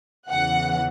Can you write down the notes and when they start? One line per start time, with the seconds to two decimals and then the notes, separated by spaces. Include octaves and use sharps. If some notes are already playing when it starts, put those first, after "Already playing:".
0.29 E2 C#3 E3 F#5